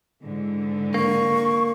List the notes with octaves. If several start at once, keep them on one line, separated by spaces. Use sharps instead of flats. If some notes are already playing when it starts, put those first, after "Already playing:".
G#2 D3 E3
A#3 C#6